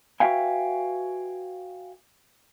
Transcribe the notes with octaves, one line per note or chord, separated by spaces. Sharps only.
F#4 B4 E5 F5 G5 G#5